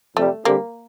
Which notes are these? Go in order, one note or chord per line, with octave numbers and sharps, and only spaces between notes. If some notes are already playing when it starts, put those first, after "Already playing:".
F2 C3 G3 A3
D3 G3 A#3 C4 G4